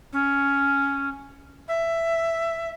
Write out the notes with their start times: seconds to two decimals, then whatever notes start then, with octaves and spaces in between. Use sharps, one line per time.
0.12 C#4
1.68 E5